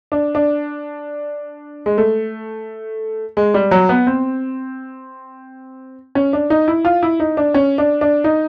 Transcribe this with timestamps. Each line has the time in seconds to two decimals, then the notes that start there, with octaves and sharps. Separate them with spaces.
0.12 D4
0.35 D4
1.86 G#3
1.98 A3
3.37 G#3
3.54 G3
3.71 F#3
3.89 B3
4.07 C4
6.15 C#4
6.33 D4
6.50 D#4
6.68 E4
6.85 F4
7.03 E4
7.20 D#4
7.37 D4
7.54 C#4
7.78 D4
8.01 D4
8.24 D#4